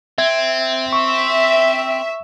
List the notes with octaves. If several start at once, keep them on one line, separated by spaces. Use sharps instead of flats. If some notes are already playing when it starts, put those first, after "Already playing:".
C4 E5 G#6
E5 C#6